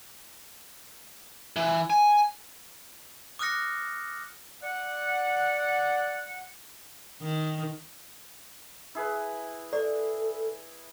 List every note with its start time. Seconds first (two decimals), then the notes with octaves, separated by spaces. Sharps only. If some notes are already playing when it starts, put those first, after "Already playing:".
1.56 E3
1.90 G#5
3.39 D6 D#6 F6 F#6 A#6 C#7
4.63 D5 F#5
7.22 D#3
8.95 E4 G#4 B4
9.73 A4 D5